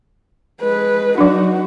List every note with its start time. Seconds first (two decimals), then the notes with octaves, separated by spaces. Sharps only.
0.61 G#3 B4
1.18 F#3 D4 D#4 F#4